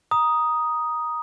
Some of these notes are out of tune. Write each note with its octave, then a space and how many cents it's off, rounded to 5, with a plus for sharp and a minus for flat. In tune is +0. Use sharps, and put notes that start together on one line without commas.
A#5 +20 D#6 +0